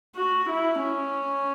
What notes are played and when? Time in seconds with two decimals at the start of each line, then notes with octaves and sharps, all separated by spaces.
0.15 F#4
0.49 E4
0.83 C#4